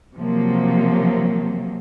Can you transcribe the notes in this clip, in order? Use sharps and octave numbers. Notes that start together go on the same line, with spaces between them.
C3 F3 F#3 A#3